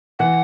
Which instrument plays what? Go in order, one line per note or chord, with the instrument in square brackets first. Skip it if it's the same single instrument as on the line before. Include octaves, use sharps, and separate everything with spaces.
[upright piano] E3 [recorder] F#5